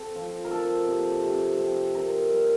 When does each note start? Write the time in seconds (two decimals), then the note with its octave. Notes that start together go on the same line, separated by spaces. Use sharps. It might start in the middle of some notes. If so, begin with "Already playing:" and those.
Already playing: C4 A4
0.15 F3
0.45 A#4
0.51 C4 A4
0.88 C3
1.23 C3
1.59 C4
1.95 C4 A#4
2.31 G3